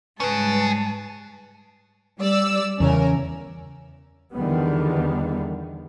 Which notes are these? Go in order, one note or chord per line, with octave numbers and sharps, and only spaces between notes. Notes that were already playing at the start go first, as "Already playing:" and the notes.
G#2 G3 C#4 G#4 B4 A5
G3 D5 E6
E2 C#3 C#4 A#4
E2 D3 D#3 G3 B3